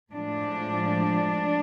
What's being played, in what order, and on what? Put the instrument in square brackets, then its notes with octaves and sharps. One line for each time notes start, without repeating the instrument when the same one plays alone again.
[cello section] A2 F3 G#3 D4